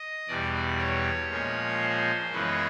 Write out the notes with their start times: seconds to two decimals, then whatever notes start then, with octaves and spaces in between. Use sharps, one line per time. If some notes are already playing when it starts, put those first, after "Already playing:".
Already playing: D#5
0.28 E2 B2 G3 D5
0.78 C#5
1.30 A#2 F3 G#3 C#4
1.81 C5
2.32 F#2 C#3 E3 G#3 B3 B4